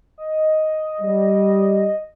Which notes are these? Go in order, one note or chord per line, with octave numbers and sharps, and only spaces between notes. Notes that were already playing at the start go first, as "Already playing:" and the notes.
D#5
G3